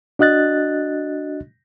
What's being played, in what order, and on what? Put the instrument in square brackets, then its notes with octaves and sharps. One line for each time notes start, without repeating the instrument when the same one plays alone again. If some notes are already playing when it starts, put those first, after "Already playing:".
[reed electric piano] D4 F#4 D#5 F#6 A6